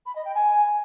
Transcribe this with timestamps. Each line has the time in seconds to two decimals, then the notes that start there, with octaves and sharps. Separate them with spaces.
0.06 B5
0.15 D#5
0.25 G5
0.34 G#5